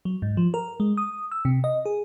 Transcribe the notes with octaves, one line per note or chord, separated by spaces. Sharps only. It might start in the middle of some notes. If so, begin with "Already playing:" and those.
F#3
G#2
F3
A#4
G#3
D#6
E6
C3
D#5
G#4